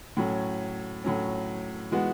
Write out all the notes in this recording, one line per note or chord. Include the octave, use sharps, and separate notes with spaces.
A2 F#3 C#4
A2 F#3 C#4
E3 G#3 B3 F#4